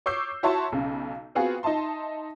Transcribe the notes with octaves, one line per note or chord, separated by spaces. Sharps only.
C#5 C#6 D6 E6 G6 C7
E4 F#4 C#5 E5 A5 C6
B1 C#3
B3 C4 F4 F#4 G#4
D#4 D#5 E5 A5 C6